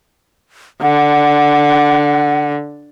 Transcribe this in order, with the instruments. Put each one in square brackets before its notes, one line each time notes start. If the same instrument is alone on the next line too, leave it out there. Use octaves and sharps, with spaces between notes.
[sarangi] D3 [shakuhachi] F#5